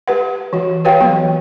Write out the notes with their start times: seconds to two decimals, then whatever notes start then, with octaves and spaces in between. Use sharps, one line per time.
0.08 G4 B4 F#5
0.53 E3 F#4
0.85 F#4 G4 B4 C#5 F5 G5
1.01 E3 F#3 B3 G5